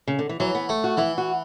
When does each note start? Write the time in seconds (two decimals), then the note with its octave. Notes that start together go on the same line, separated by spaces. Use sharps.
0.07 C#3
0.19 D3
0.29 E3
0.40 E3 F#3
0.55 B3
0.69 A3
0.84 F#4
0.97 E3 E4
1.18 F#4